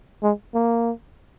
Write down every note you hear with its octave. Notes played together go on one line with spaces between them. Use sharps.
G#3
A#3